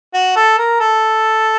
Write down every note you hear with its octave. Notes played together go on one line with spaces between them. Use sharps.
F#4
A4
A#4
A4